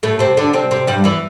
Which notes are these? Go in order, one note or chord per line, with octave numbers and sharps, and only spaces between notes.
A2 A3
C3 C4
D3 D4
C3 C4
C3 C4
G2 G3
E2 E3